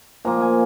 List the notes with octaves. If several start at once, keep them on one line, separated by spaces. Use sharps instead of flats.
A#2 F3 A#3 A#5
G#5